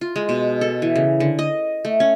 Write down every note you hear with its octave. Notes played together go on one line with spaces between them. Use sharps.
F4
G#3
B2
A4
E3
C#3
D3
D#5
A3
C#4